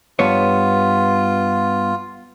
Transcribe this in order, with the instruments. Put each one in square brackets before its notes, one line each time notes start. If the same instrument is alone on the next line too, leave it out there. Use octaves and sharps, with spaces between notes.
[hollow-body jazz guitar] G2 B3 C#5 [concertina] F4